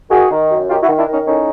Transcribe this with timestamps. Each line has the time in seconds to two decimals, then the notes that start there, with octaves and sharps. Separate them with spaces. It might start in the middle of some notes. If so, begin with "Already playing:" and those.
0.10 D#3 F#4 G#4
0.30 D#3
0.50 F#2
0.69 D#3 F4 G4
0.83 E4 F#4
0.88 D#3
0.98 D4 E4
1.07 D#3
1.12 C#4 D#4
1.26 A2 C#4 D#4